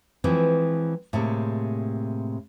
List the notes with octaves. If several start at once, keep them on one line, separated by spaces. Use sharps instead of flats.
E3 F3 G#3 C4
A2 C3 G#3 A#3